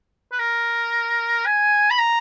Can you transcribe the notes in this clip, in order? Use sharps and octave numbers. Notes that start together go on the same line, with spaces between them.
B4
A#4
G#5
B5
A#5